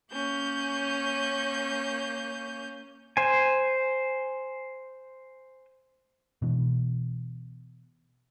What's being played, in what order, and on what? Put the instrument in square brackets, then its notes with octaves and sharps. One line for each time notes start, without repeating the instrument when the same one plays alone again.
[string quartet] A#3 C#4 G6
[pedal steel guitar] C5 G#5
[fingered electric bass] B2 E3